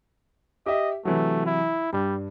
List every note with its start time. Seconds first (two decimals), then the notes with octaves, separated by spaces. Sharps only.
0.66 G4 D#5 E5
1.05 C3 E3 F#3 A3
1.46 E4
1.93 G2 G3